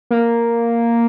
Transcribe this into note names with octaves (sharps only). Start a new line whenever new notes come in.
A#3